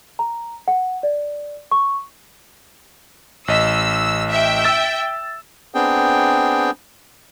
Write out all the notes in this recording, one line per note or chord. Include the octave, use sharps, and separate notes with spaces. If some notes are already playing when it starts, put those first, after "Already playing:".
A#5
F#5
D5
C#6
A1 D#5 E6 B6
E5 G5
E6 A6
B3 C4 D4 G#4 G5